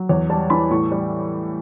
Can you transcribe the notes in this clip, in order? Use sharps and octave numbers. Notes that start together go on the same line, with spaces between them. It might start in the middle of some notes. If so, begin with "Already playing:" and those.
Already playing: F#3
E2 C#5
G3 A5
E3 B5
A2 C#6
G3